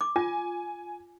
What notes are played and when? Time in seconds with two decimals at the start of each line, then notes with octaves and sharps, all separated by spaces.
0.01 D6
0.16 F4 G#5